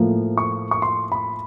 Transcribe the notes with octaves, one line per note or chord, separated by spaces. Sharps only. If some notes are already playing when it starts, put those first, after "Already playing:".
Already playing: A2 F3 A#3
C#6
C#6
C6
B5